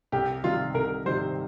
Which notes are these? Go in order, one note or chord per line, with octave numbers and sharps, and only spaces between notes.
C2 G4
C3 D#3 G3 F4
C2 A#4
C3 D#3 G3 C5